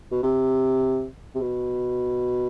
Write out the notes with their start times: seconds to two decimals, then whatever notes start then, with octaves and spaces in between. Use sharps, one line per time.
0.11 B2
0.23 C3
1.35 C3
1.41 B2